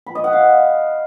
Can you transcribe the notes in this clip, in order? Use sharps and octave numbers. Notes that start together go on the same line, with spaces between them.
B5
D#5
F#5
F5